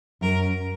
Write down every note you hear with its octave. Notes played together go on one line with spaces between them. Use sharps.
F#2 A#4